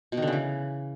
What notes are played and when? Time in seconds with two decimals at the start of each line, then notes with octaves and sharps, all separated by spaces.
0.12 B2
0.17 D#3
0.22 D3
0.27 C#3
0.32 E3